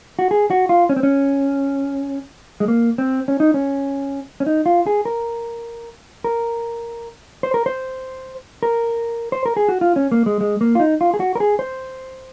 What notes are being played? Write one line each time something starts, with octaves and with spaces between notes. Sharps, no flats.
F#4
G#4
F#4
F4
C#4
C4
C#4
G#3
A#3
C4
C#4
D#4
C#4
C#4
D#4
F4
G#4
A#4
A#4
C5
A#4
C5
A#4
C5
A#4
G#4
F#4
F4
C#4
A#3
G#3
G#3
A#3
F4
D#4
F4
G#4
F#4
A#4
G#4
C5